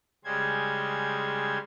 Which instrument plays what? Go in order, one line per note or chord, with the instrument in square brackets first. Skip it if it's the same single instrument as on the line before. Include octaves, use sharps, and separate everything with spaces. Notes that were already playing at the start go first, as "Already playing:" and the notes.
[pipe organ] C#3 G3 G#3 C5 G#6